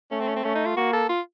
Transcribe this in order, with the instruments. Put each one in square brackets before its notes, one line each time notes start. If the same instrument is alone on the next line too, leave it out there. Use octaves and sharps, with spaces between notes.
[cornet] A3 [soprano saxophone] C#4
[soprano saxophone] C4
C#4
C4
[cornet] A3 [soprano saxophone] C#4
[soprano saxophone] D#4
F4
[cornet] A#3 [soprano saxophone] F#4
[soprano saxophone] A4
F4